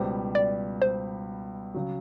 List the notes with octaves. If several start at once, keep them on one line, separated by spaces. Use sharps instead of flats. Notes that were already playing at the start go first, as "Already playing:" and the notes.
Already playing: C#2 B2 G3 B3 C5
D5
C5
C#3 F#3